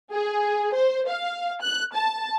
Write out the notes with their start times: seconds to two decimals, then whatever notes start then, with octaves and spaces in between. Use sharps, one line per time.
0.13 G#4
0.74 C5
1.09 F5
1.62 F#6
1.94 A5